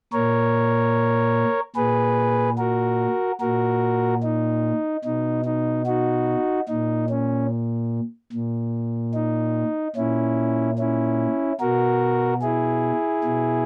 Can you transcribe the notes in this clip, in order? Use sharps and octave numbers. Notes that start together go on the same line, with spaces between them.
A#2 A#4 C#5
A#2 G#4 B4
F#4 A#4
A#2 F#4 A#4
D#4
B2 D#4
D#4
D#4 F#4
A#2 D#4
C#4
A#2
D#4
A#2 C#4 E4
C#4 E4
B2 F#4 A#4
E4 G#4
B2